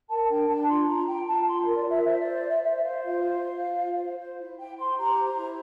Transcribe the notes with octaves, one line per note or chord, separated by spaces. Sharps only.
A#4 A5
D4 G5
D4 A5
F4 C6
F4 A#5
F4 G5
F4 A5
F4 C6
A#5
A#4
D5
F4 E5
C5 E5
C5 D5
D5
C5
E5
C5 E5
E5
C5 F5
F4 F5
C5
F4
C5
F4
C5
C5
E4
E4 G5
C5 C6
G4 A#5
C5
A#5
E4